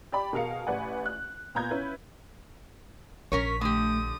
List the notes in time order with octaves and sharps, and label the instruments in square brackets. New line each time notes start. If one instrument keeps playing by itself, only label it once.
[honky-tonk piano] G4 D5 B5
B2 G#4 A#4 F5 C#7
A1 B4 D5 F#5 G#5
F#6
A#2 B3 A#5 G6 G#6
C#4 E4 B4
[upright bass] A#1 [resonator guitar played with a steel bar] C#4 A#4 C#5 [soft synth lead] B6
[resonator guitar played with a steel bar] D3 G4 [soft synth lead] A3 [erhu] D#6